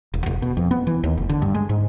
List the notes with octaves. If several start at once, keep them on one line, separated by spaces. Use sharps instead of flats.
E1
E1
B2
F2
B3
E3
D#2
F1
D3
G2
G#3
G#2